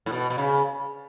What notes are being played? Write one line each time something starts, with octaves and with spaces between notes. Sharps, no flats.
A2
B2
B2
C#3